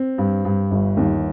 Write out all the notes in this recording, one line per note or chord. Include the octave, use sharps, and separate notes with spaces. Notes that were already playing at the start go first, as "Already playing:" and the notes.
Already playing: C4
G2
G2
G1
D#2